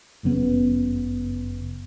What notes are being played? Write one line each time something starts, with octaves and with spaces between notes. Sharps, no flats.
G1 F#2 C#3 B3